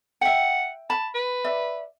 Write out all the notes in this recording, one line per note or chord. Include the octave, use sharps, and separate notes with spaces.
E5 F#5 G5
A5 B5
B4
D5 E5